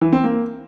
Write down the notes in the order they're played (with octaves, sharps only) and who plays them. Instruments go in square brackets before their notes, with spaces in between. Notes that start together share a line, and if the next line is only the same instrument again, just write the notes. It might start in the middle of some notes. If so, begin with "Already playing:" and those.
[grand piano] E3
C4
A#3